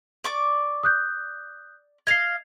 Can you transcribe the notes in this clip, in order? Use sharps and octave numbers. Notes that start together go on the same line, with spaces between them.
D5 C#6 D6
D#6 F#6 G6
D#5 F5 G#6 C7